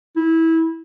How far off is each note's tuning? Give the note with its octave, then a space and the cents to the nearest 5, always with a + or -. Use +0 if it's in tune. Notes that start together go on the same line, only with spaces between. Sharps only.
E4 -20